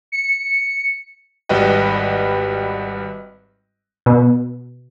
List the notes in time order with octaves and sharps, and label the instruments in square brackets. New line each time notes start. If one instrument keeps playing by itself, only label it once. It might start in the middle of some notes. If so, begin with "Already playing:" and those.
[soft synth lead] C#7
[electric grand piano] G#1 G3 F#4 B4 D#5 G5
[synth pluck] B2